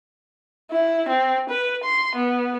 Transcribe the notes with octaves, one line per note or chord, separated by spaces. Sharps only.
E4
C4
B4
C6
B3